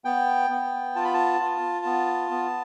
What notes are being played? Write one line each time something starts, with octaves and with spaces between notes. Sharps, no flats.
B3 G5
B3
F4 A5
B5
A5
F4
B3
B3